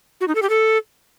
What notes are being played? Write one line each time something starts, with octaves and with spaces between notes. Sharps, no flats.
F#4
D#4
A4
G4
A4